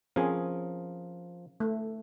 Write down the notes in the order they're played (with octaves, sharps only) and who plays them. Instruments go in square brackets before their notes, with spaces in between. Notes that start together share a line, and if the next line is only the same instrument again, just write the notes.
[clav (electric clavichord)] F3 A#4 [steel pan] C4 C#4 G#4
[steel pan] A3